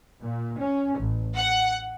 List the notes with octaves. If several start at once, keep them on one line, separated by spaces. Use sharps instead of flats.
A#2
C#4
A1
F#5